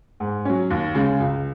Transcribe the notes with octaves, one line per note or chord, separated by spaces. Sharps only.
G#2
F#3 C#4
D#2
C#3 G#3
C#2